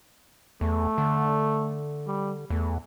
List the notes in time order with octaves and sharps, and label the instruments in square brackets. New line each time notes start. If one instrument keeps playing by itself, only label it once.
[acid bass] E2 [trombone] A3
[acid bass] D3
[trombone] G3
[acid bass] E2 [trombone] A3